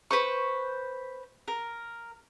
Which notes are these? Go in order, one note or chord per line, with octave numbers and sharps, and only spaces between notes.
B4 C5 C#6
A#4